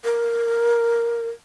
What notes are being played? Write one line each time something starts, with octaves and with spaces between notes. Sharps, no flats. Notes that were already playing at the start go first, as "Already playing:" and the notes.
A#4